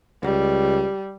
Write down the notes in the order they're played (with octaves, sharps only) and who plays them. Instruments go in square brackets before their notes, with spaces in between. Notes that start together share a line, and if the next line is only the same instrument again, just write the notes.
[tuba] C#2 [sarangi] G3